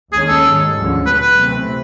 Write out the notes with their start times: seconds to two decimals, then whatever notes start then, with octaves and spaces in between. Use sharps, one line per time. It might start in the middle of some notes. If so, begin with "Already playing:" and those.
0.12 D#2 D#3 G#3 C#4 G#4
0.29 A4
0.44 G#2 D#3 G3
0.75 D2 D3 F3 G#3 C#4
1.06 A#2 F#3 B3 B4
1.21 B4
1.37 C3 E3 A3 C4